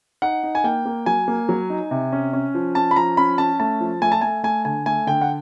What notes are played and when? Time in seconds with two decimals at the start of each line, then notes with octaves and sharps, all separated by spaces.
0.22 D#4 F#5
0.43 D#4
0.55 G#5
0.64 A#3 G5
0.85 A#3
1.06 F#3 G#5
1.28 A#3
1.49 F#3
1.70 D#4
1.91 C3
2.12 C#4
2.33 C#4
2.55 F3
2.75 C#4 A5
2.91 B5
2.96 F3 A#5
3.17 C#4 B5
3.38 C#4 A5
3.60 A3 A5
3.80 F3
4.02 A3 G#5
4.12 A5
4.21 A3 G#5
4.44 A3 G#5
4.65 D3 G#5
4.86 A3 G#5
5.07 D3 G5
5.21 F#5